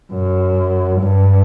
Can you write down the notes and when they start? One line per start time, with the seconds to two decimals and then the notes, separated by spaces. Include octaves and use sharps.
0.13 F#2
1.01 G2